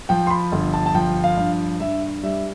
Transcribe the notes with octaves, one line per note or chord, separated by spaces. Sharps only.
F3 G5
C6
B5
G1
A5
A5
F3 G5
F5
G2
G2 E5
G3 E5